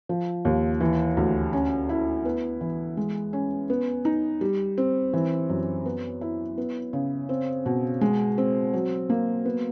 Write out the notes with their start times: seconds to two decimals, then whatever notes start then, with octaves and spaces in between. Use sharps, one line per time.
0.09 F3
0.45 D#2
0.80 E3
1.17 D2
1.53 C#4
1.89 E4
2.25 B3
2.61 E3
2.97 G#3
3.33 C#4
3.70 B3
4.05 D#4
4.41 G3
4.78 C4
5.13 E3
5.49 F#2
5.86 B3
6.21 E4
6.58 B3
6.93 C#3
7.29 C4
7.66 B2
8.01 G#3
8.38 C4
8.74 F#3
9.10 A#3
9.45 B3